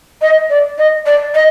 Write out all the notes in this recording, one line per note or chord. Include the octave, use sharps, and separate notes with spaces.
D#5
D5
D#5
D5
D#5